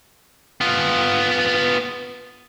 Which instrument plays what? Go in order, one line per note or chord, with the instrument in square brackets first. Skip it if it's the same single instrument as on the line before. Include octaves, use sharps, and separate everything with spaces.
[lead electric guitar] B3 F4